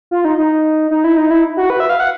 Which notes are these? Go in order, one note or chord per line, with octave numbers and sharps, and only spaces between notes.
F4
D#4
D#4
D#4
E4
D#4
E4
F#4
B4
E5
F5
F#5